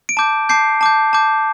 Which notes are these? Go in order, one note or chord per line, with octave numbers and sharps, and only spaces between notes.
D7
A5 D6 G6
A5 D6 G6 C7
A5 D6 G6
A5 D6 G6